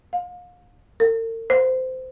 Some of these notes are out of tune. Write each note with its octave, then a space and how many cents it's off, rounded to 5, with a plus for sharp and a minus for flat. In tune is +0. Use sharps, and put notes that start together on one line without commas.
F5 +35
A#4 -45
C5 -20